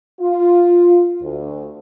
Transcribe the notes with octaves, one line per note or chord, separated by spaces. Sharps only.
F4
D2